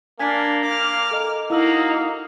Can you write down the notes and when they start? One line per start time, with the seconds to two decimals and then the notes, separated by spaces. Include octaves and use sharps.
0.19 A#3 D4 G#5 G#6 B6
0.66 D6 F6
1.11 A4 D#5 A#5
1.50 A#3 D#4 E4 F#4 E6 F#7